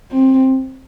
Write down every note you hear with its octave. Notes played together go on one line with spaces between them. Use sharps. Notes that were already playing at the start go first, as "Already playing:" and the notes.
C4